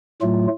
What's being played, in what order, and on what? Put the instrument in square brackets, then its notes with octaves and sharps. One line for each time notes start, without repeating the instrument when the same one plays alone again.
[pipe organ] A2 F#3 A3 F4